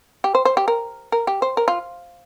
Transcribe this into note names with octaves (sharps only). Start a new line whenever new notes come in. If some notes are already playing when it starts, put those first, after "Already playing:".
G4
C5
C5
G4
A#4
A#4
G4
C5
A#4
F4